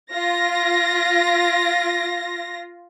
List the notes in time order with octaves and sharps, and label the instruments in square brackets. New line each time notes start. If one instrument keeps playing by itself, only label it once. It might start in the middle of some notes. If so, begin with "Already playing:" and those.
[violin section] F4 A#6